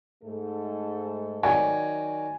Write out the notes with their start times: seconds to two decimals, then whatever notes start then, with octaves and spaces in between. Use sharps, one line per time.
0.23 G#2 A3 A4
1.43 D#3 F#3 D5 G#5